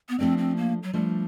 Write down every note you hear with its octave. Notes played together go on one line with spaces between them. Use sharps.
B3
F3 A3 C4 D4
C4
A#3
F#3
F3 G3 A3 D4